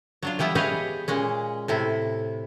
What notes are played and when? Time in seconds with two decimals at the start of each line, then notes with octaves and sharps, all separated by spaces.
0.23 F#3 D4 F4
0.39 E3 G3 B3 E4
0.55 G4 G#4 B4 C#5 D#5 F5
1.08 A#2 G#3 C#4
1.68 A2 C3 E4